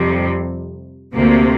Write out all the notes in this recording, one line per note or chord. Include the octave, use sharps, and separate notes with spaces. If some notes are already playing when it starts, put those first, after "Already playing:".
Already playing: F2 C3 G3
D2 C3 A#3